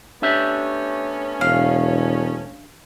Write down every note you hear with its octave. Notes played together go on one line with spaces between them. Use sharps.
A3 B3 C#4 D4 G4 E5
E1 F5